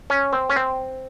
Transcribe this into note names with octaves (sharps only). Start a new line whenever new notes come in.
C#4
C4
C#4
C4